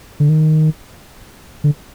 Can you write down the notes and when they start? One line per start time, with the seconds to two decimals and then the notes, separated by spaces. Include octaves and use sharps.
0.20 D3
0.29 D#3
1.64 D3